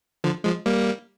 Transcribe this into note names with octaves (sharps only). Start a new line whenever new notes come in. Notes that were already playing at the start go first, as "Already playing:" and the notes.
D3 F3
F3 G#3
G3 A#3